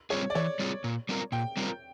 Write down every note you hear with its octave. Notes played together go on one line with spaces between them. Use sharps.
G3 C4 F4 G#4 C#5
D5
E3 C#5
G3 C4 F4 G#4
A#2
G3 C4 F4 A#4
A#2 G5
G3 C4 F4 A#4